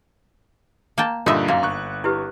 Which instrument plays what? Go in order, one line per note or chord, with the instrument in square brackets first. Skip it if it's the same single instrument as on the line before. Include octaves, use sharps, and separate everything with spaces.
[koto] A#3 G5 A5
[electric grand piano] G2 A#2 D3 [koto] D#4 E5 [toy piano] F#4 B5
[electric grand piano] F#2 [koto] A#3 [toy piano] D4 F5
[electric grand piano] G1 C#6 F#6
[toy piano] E4 G4 B4